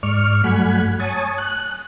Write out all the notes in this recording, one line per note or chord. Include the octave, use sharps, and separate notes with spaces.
G#2 D5 C#6 F6
G2 F#3 A3 F#5 G#5 B5
C#5 G#5 A5 D#6
F#6